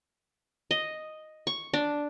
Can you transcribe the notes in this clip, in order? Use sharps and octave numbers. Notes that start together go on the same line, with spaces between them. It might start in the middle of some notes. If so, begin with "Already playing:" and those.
D#5
C#6
D4